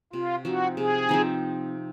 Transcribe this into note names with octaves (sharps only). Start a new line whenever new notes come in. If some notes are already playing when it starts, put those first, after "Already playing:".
C3 F4
F3 C4 D#4 F#4
C3 G#4
F3 C4 D#4